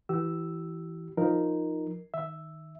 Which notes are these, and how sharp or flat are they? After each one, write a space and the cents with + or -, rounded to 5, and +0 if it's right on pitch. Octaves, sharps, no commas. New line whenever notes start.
E3 +0 G4 -35 E6 +0
F3 +0 D#4 +0 A#4 +0
D#3 +0 E5 +0